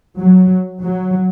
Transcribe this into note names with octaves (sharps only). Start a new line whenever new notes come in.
F#3
F#3